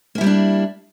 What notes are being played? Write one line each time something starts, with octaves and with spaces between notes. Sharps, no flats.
G3 A#3 B3 D4 E4